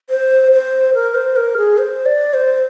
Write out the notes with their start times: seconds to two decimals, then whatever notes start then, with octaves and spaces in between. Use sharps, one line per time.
0.10 C5
0.53 C5
0.94 A#4
1.15 C5
1.36 A#4
1.57 G#4
1.78 C5
2.06 D5
2.34 C5